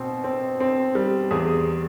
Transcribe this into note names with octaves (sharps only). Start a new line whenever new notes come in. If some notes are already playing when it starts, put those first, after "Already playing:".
Already playing: B2 C4
C4
C4
G3
E2 G#4